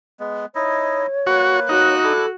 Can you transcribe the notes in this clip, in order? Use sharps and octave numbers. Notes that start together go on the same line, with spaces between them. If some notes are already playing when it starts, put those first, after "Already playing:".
G#3 B3
D#4 E4 C#5 D#5
A#3 F#4 B4
D#4 F#4 F#6
D4 E4 A4 D6